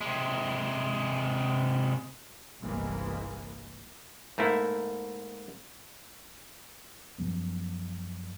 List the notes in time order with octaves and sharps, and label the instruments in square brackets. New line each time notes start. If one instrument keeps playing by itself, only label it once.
[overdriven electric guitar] C3 G#3
[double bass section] G1 C2 E3 G#3 A#3
[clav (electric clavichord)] G#2 A3 A#3 E4
[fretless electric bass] F#2 F3 G3 B3